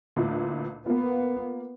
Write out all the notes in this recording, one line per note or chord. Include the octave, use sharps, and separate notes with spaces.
A1 D2 A#2
A#3 B3 F4